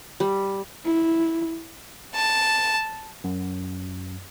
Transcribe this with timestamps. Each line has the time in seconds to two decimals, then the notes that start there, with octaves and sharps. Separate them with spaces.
0.20 G3
0.85 E4
2.14 A5
3.24 F#2